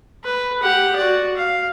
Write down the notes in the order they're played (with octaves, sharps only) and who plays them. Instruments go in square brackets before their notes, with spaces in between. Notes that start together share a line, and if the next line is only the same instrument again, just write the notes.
[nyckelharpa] B4
G4 F#5
F#4 D5
F5